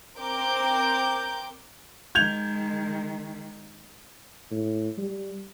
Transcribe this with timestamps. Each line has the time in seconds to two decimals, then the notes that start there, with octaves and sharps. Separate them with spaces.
0.17 C4 A#4 D6 G6
2.15 D#3 G#3 G6 G#6 F7
4.51 A2
4.98 G3